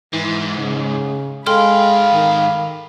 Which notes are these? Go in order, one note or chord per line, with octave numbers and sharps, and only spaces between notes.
G#2 E3
C#3
G#2 G#3 A4 F5 G5 B5 C6 F6
D#3